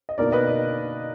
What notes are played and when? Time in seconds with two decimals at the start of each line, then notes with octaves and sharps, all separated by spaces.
0.09 D#5
0.18 B2 A#3 D#4 A#4 D5
0.32 B4 D#5